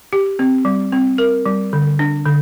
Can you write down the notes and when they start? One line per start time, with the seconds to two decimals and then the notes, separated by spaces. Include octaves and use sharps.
0.13 G4
0.39 C4
0.65 G3
0.93 C4
1.18 A#4
1.46 G3
1.73 D3
1.99 D4
2.26 D3